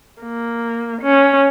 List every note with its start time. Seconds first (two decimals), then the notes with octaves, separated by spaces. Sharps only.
0.22 A#3
1.02 C#4